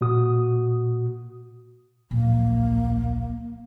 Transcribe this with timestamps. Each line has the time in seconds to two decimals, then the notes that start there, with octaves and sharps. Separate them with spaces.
0.01 A#2 F#4 D#6
2.11 D1 A#1 A#3